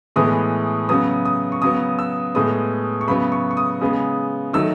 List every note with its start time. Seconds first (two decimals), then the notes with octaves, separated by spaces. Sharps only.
0.16 A2 E3 G#3 B3 D#6
0.89 C#3 F#3 B3 D#6
1.25 D#6
1.52 C#6
1.62 C#3 F#3 B3 D#6
1.99 E6
2.35 A2 G#3 B3 D#6
3.01 C#6
3.07 C#3 F#3 B3 B5
3.32 C#6
3.51 C#6
3.57 D#6
3.81 C#3 G#3 B3
4.53 D#3 F#3 A3 E6